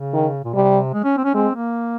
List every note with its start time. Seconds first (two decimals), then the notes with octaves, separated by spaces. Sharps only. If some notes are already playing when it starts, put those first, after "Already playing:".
Already playing: C#3
0.14 D#3
0.44 A#2
0.54 C3 G3
0.94 G#3
1.04 C#4
1.17 C4
1.24 C#4
1.34 G#3 C4
1.55 A#3